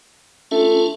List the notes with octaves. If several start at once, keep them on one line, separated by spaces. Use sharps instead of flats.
A3 C#4 D4 F4